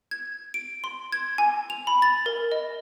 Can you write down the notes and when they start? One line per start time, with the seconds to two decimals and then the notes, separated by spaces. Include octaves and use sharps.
0.11 G#6
0.54 D7
0.84 C6
1.12 G#6
1.38 G#5
1.70 F7
1.87 B5
2.02 A6
2.26 A#4
2.52 D#5